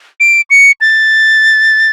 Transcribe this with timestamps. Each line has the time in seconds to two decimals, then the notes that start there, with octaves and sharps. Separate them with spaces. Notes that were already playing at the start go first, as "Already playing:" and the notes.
0.20 D7
0.50 C#7
0.81 A6